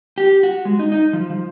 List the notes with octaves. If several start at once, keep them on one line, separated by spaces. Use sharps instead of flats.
G4
F#4
G#3
D#4
D#4
F3
F3